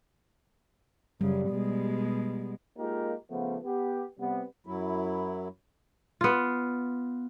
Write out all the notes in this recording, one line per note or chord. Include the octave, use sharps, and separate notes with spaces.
F#2 C#3 G3
B2 G#3
G#3 A#3 D#4 F4 G4 A#4
C#3 F3 A3 B3
B3 G4
C3 G3 B3
F#2 F#3 E4
B3 F4